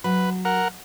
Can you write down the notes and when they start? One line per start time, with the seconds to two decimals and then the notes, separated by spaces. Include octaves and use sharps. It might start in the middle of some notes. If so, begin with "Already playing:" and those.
0.04 F#3 B4
0.45 A#4 F#5